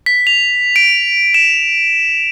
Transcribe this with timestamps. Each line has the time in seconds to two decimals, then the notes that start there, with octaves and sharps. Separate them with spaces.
0.06 B6
0.27 F7
0.76 D7
1.34 E7